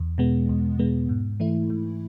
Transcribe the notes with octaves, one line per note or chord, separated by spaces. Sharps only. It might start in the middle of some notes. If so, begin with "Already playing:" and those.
Already playing: E2
B2 G#3 B3
E2
B2 G#3 B3
G#2
E3 A3 E4
G#2